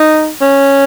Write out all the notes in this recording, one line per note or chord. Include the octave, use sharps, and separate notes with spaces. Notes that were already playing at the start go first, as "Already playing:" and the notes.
Already playing: D#4
C#4